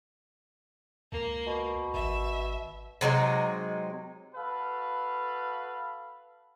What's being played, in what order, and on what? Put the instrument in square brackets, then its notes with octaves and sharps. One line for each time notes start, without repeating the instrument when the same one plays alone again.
[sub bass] C#2 [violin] A#3
[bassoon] B2
[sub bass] G#1 [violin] E5
[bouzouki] C3 F#3 G#3 D#4
[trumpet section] F#4 A4 B4 F5